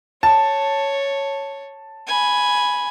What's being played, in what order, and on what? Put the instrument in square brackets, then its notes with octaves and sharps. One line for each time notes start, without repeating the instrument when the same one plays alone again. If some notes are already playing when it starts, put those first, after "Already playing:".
[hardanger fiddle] C#5 [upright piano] A5
[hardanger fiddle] G#5 B5